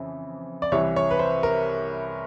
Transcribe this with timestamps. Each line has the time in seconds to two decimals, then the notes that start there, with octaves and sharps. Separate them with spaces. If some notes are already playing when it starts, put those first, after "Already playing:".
Already playing: F2 C#3 E3
0.62 D5
0.72 C2 C3 E3 C#5
0.96 C#5
1.11 B4
1.19 C5
1.43 A#4